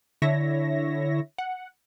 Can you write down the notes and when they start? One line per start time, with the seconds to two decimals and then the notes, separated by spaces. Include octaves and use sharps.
0.22 D3 E4 C#5 E5 A#6
1.38 F#5